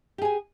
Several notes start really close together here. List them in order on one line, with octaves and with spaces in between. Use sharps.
G4 G#4 G#5